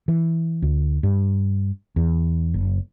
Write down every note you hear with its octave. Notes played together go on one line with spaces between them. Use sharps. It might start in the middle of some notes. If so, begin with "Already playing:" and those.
E3
D2
G2
E2
F#1